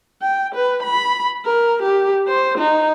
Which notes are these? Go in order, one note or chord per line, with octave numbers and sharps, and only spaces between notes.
G5
B4
B5
A#4
G4
C5
D#4